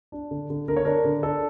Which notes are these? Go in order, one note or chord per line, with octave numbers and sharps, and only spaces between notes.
D4
D3
D3
D3 A#4
C#5
D4 A#4
D3
D4 A4